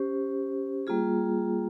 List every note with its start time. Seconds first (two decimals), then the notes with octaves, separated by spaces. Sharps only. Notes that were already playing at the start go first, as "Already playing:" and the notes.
Already playing: C#4 G4 C5
0.87 G3 A#3 F4 G#4